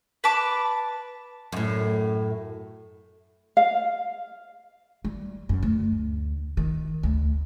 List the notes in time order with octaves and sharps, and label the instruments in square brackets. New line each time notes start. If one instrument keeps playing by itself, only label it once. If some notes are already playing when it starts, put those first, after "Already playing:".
[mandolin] B4 A5 D6
[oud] F#2 A2
[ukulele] F5
[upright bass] G3
F#2
D2
D#3
D2